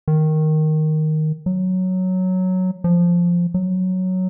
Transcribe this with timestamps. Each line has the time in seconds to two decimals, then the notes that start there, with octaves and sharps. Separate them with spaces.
0.08 D#3
1.46 F#3
2.84 F3
3.54 F#3